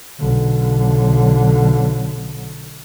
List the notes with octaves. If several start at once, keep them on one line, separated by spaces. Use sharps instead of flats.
B1 D3